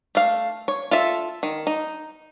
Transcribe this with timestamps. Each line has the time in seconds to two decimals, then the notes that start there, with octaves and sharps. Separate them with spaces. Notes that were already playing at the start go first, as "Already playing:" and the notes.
0.15 A3 F5
0.68 C#5
0.91 F4 A4 E5
1.43 D#3
1.67 D#4